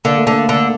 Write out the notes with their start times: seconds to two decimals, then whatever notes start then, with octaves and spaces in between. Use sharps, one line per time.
0.05 D3 A#3
0.18 A3
0.27 D3 A#3
0.49 D3